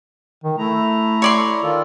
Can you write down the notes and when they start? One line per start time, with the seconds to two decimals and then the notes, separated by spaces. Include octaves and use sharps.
0.44 D#3
0.58 A3 E4 A#5
1.22 C#5 D5 C6
1.62 D#3 F4 A4